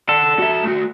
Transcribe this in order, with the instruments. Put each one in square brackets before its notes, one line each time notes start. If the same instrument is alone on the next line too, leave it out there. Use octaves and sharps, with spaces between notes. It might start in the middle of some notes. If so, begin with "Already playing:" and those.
[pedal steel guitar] A4 [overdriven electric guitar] D5 F#5
[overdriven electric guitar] F#4 E5
A3 F#4